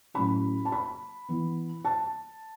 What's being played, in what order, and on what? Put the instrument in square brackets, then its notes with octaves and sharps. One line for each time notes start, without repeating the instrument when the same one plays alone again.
[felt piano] A2 F#3 C#4 B5
A5
B5
E3 B3
A5